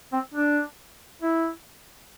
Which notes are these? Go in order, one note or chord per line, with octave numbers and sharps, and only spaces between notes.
C4
D4
E4